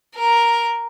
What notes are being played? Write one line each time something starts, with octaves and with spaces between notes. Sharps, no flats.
A#4